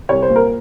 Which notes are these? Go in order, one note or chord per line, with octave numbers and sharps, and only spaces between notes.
C2 C#5
C5
A#2
A#4